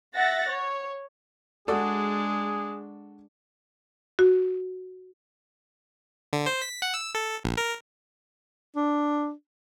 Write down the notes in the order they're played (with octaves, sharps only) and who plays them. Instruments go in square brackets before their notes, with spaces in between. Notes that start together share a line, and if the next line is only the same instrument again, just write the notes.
[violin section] E5 F#5 A6 A#6
C#5
[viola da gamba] G#3 D4 [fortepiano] F#4 A4 D5 [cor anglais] G#4
[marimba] F#4
[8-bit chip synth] D3
C5
B6
F#5
E6
A4
A#1
A#4
[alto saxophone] D4